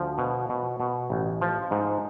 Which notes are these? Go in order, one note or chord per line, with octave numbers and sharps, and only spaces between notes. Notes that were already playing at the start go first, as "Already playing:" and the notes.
Already playing: D2 F3
B2
B2
B2
A1
F3
G#2